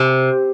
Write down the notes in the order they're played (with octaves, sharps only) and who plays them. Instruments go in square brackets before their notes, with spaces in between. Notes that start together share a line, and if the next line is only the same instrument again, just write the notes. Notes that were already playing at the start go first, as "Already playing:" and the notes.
Already playing: [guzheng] C3